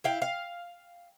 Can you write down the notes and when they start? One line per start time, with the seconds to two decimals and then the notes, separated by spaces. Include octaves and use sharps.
0.04 E4 F5 G5
0.22 F5